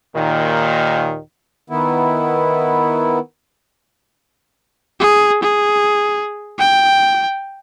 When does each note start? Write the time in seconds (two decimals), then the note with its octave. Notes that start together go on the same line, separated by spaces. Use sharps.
0.15 D#2 A#2 D#3
1.70 D#3 B3 E4
5.00 G#4
5.43 G#4
6.59 G5